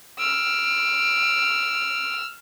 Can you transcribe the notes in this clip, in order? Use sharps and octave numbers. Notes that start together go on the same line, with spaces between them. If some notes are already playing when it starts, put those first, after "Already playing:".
E6 F6 D7